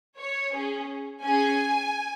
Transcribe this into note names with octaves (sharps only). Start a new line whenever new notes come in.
C#5
C#4 G#4
C#4 G#4 G#5